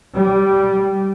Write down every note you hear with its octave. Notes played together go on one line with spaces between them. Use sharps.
G3